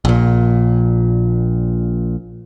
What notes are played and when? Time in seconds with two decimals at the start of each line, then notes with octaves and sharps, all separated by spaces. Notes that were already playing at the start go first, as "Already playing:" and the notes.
0.05 A#1 A#2